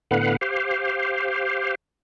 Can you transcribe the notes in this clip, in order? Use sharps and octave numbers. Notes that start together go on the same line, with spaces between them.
A2 D3 B3 B4 F5 F#5
G4 C5 F5